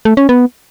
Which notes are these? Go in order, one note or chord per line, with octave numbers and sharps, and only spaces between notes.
A3
C#4
B3